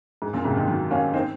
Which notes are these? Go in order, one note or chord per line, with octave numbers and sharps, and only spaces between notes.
G#2
F#2 A#2
G#2 C3
C3 D#3
D#3 F#3
A#3 C#4
C4 D#4